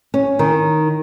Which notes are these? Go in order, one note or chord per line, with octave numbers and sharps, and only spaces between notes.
C#4
D#3